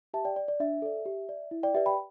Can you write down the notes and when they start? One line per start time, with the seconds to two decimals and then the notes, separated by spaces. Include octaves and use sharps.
0.14 G4 E5 A5
0.25 D5 G5
0.36 D5
0.48 D5
0.60 D4 E5
0.82 A4 D5
1.06 G4
1.29 D5
1.51 E4
1.63 D5 G5
1.74 G4 B4 D5 E5
1.86 G5 B5